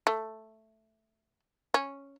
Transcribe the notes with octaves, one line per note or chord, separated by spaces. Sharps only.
A3
C#4